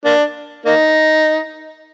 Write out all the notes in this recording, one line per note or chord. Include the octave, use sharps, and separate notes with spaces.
A#3 D4
A#3 D#4